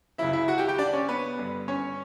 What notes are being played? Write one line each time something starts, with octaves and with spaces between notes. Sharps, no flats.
C#2 C#3 F#3 E4 E5
E4 E5
F#4 F#5
G4 G5
G4 G5
D4 D5
C#4 C#5
B3 B4
G2 D3 G3
C#4 C#5